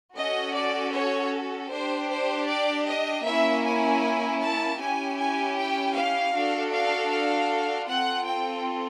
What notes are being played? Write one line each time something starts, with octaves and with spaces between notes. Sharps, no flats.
C#4 F#4 A4 D#5
D5
C#5
D4 G4 C5
C5
D5
D#5
A#3 C#4 E4 E5
G#5
A5
C#4 E4 G4 G#5
G#5
G5
F5
D4 F#4 A4
F5
F5
C4 F4 A4 F#5
G5